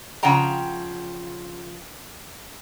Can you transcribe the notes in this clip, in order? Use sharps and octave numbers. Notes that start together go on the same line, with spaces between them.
C#3 F3 F#5 G5 A#5